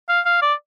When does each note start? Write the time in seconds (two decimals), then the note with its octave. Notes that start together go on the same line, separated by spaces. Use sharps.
0.09 F5
0.25 F5
0.42 D5